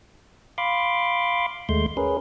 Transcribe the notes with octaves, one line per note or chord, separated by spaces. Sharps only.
F5 B5 C6 D6
D#2 G#3 A3 C6 G6
C#4 G#4 A#4 B4